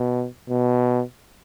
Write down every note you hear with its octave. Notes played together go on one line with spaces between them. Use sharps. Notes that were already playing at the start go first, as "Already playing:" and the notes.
Already playing: B2
B2